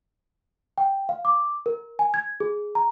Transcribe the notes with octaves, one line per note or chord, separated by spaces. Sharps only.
G5
F5
D6
A#4
G#5
G#6
G#4
A#5